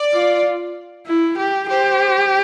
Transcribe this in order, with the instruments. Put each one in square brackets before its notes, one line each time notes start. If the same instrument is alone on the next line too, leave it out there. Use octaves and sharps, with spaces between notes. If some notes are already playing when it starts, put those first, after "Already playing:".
Already playing: [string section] D5
[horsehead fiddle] F4
E4
G4
[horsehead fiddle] G4 [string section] C5